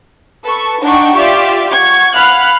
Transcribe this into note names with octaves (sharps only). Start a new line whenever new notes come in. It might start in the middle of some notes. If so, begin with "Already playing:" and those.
A4 B4 C#6
D4 D#4 F#5 G5 C#6
F4 G4 D5 E5
F#5 C#6 G#6
F5 F#5 B5 F6 F#6